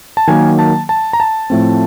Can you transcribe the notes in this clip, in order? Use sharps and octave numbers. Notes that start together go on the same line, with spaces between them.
A5
D#3 F#3 A#3 G#5
A5
A5
A#5
A5
A2 F3 A3 C4